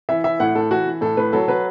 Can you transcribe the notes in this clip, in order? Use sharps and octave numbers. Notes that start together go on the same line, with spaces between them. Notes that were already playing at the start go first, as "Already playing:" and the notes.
E3 E5
E3 E5
A2 F#5
A2 A4
E3 F#4
E3
A2 A4
A2 B4
F#3 A4
F#3 B4